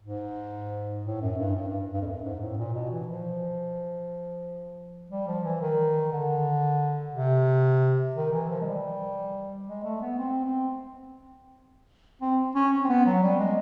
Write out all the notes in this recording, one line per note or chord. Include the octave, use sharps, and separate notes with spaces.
G#2
A2
F#2
G2
G2
G2
G2
F2
F#2
G#2
A2
A#2
B2
E3
F3
G3
F3
E3
D#3
D3
C3
D#3
E3
F3
G#3
G3
G#3
A3
B3
C4
C4
C4
C#4
C4
B3
F#3
G3
G#3